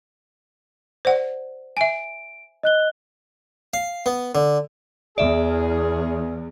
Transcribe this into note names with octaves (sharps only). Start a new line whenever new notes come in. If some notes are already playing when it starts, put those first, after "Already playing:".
C5 D5 F#5
E5 G#5 D7
D#5 F#6 G7
F5
B3
D3
E2 G#4 D5 E5